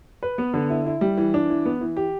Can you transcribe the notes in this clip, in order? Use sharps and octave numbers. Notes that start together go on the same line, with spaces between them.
B4
B3
D3
E4
E4
G3
E3
D4
E3
B3
E3
G4